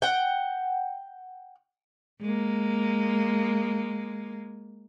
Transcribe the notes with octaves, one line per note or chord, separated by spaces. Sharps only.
F#5 G5
G#3 A#3